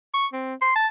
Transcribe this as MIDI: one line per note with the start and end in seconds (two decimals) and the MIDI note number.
0.14 0.26 85
0.33 0.54 60
0.62 0.71 84
0.76 0.87 81